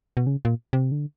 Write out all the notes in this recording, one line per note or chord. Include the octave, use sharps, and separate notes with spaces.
B2
C#3
A#2
C3
D3